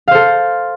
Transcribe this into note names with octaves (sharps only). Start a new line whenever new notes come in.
A4 C5 F5